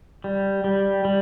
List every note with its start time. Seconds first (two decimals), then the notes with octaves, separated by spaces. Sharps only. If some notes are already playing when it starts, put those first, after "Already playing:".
0.24 G3
0.64 G3
1.05 G3